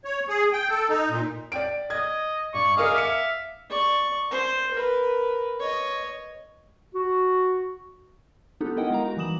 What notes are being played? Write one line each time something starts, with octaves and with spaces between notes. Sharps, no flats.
C#5
G#4
G5
A4
D#4
A#2
D5 G5 D7
D#5 G#6
G2 D5 C#6
G#4 A#4 D#5 F5
E5 D6 C#7
D5 C#6
C5
A#4 B4
C#5 D#5
F#4
B3 D4 D#4 F4 G4 A4
B3 E4 A#4 D#5 F#5 G5
G#3 F5 A#5
D#4 F#4
E3 G3 D6 D#6 E7 F#7